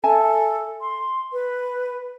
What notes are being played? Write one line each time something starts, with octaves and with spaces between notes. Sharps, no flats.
A4 E5 G#5 A5
C6
B4